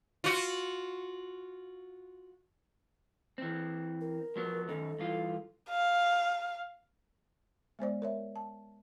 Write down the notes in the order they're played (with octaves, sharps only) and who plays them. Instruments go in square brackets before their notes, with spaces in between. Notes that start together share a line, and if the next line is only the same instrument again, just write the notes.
[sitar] F4 F#4
[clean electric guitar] E3 C4
[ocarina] A#4
[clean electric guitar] F3 F#3 B3
[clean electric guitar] F#2 D#3 D#4 [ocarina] A4
[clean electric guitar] G2 E3 F4
[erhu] F5
[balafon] G#3 B3 C5 D5
A#4 C#5 E5
A5